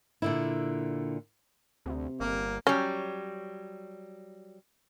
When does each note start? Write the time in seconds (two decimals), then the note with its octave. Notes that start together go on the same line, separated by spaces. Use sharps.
0.22 A#2 D3 E4
1.86 D2 C3
2.20 G1 A#3
2.67 F#3 G3 C#4